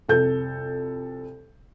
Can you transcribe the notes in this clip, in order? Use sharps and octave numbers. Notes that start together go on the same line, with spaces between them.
C2 F2 A4 G6